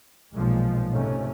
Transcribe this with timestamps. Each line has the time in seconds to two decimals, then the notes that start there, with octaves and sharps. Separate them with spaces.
0.34 B1 A#2 F3 G#3
0.92 G#2 C3 A3 C#4